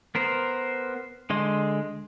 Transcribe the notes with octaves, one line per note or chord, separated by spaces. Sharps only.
B3 A#4 C5
D3 G#3 D#5 C6